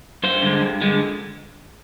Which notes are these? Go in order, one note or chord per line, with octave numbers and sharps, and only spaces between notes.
G2 C5
D3 G#3
G2
D3 G#3